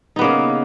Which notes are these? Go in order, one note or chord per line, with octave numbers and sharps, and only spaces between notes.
C#3 A#3 B3 D#4